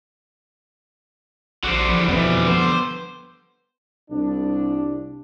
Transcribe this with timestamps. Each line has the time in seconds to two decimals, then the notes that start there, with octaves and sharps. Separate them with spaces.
1.64 A#1 D3 G3 F#4 C5
1.89 E3 F3 B3
2.08 F2 B2 E3 B3
2.47 B3 C5
4.11 C2 D4